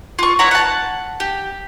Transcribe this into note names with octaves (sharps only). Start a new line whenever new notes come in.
F4 C#6
E4 C#5 F#5 A#5
F#5 A5
G4